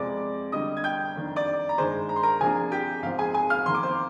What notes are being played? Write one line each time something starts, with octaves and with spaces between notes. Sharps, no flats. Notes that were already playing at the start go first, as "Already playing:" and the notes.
Already playing: F2 C3 F3 G#3 D5 D6
D3 G3 D4 D#5 D#6
G#6
G5 G6
F2 D#3 A#3 D4
D5 D6
A#5
G2 D#3 G#3 C5 C6
A#5
C6
A#4 A#5
C3 F3 A#3 D4 G#4 G#5
G4 G5
G#2 F3 C4 F5
G#4 G#5
G#4 G#5
F5 F6
F2 D#3 A#3 C6
D6
C5 C6